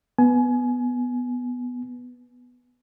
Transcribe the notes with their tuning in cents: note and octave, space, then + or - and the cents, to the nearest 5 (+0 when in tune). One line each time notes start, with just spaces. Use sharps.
B3 +0 G#5 +25